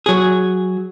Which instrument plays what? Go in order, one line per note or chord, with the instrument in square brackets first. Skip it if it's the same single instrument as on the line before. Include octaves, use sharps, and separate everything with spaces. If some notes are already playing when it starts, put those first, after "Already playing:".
[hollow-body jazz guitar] F#3 G#4